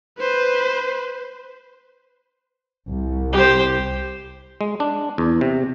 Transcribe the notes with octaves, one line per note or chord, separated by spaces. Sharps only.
B4 C5
C2
G4 C5
G#3
D4
E2
C3